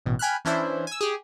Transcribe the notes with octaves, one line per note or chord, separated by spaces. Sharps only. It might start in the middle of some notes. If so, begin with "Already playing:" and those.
A1 B2
G5 G#5 B5 F6 F#6
E3 C#4 D4 E4 C5 E5
G#5 E6
G4 G#4